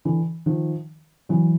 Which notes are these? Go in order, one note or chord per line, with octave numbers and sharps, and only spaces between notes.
D3 E3
D#3 F3
E3 F#3